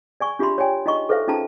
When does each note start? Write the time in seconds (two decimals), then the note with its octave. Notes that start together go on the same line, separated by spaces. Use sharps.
0.20 D5 G#5 C#6
0.39 D4 F4 G4 E5 B5 C6
0.58 C#5 D5 G5 G#5
0.86 D#4 F4 D#5 A#5 C#6
1.09 A4 B4 C5 E5 F5
1.28 C#4 D#4 F4 A5 A#5